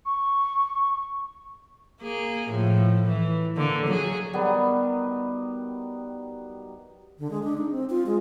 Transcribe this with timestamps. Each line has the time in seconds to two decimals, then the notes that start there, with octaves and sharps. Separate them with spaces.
0.05 C#6
2.02 A#3 G#4
2.48 A2 F3
3.06 E3
3.56 D3 A#3
3.86 F#3 G#4
4.33 D#3 F#3 G3 B3
7.19 D3
7.31 G#3
7.43 D4
7.58 D#4
7.71 C4
7.90 F4
8.06 G#3